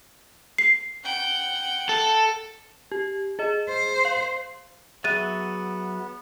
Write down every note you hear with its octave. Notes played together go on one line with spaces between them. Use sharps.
C7
F#5 G5
A4
G4
G#4 D#5
C5
F5
F#3 B3 G#4 E5 F#6 A6 D#7